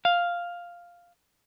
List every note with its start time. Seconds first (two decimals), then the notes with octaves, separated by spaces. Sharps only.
0.05 F5